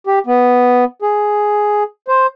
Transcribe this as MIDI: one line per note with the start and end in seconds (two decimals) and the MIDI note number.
0.07 0.19 67
0.27 0.84 59
1.02 1.83 68
2.08 2.26 72